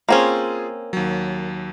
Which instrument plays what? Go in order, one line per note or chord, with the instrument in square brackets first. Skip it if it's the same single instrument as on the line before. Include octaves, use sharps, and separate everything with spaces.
[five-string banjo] A#3 C4 C#4 [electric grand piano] F4 G#4
[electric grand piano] D#2 F#3